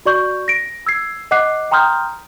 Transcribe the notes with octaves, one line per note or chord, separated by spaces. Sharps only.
F#4 D5 C#6 G6
A#6 D7
E6 G#6 C7
D#5 F#5 D6 F#6 C7
G5 A#5 C6 D#6 F6 G6